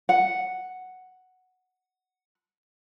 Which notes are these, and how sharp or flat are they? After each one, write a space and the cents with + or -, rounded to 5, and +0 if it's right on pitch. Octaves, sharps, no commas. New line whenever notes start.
F#5 +0